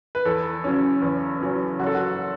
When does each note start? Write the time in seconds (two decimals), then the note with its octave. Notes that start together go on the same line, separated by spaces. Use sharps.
0.15 B4
0.25 E2 A4
0.64 C#3 F#3 C#4
1.02 E2
1.41 C#3 F#3 C#4
1.80 F#1 F#4
1.86 A4
1.95 F#4